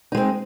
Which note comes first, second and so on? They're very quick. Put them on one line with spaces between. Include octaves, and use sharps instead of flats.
D#4 G#3 C4